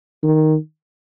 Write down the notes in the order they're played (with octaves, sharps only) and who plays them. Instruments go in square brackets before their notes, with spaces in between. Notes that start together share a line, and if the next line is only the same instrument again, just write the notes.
[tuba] D#3